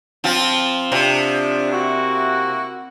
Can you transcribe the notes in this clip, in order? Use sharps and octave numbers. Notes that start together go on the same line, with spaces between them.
F3 C4 F4
C3 F3 D4
A#3 E4 F#4